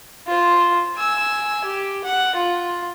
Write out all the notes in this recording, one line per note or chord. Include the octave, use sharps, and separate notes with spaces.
F4 C5
G#5 E6
G4
F#5
F4